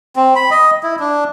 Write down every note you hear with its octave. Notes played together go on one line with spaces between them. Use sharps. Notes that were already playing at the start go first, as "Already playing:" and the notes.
C4
B5
D#5
E4
D4